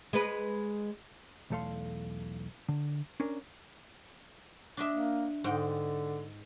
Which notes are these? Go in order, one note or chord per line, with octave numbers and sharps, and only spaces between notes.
G#3 B4
B1 E2 A3 A4 F5 C6
D3
C#4 D4 A#4
D4 D#5 E5
A#3
G#2 D3 D#5 G5